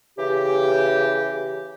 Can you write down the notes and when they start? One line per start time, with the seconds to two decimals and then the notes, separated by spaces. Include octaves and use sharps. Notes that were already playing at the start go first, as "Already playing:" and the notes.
0.17 C#3 E3 G4